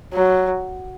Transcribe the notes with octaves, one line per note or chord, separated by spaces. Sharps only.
F#3